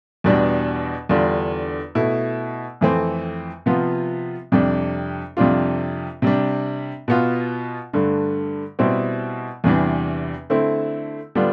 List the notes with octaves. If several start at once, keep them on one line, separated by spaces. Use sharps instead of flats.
E2 B2 G3 D4
E2 D3 G3 D4 F4
B2 A3 E4
F2 E3 A3 C4
C3 F3 B3 F4
F2 C3 G3 D4
F2 C3 G3 D4 F4
C3 G3 D4
B2 B3 F4
G2 D3 A3
B2 G3 C4 E4
E2 C3 E3 G3 D4
D3 A3 C4 E4
D3 G3 B3 D4 F4